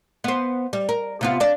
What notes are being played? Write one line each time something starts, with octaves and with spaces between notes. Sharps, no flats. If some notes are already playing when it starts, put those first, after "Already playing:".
B3 C5
G3
A#4
C3 B3 F4
D4 D5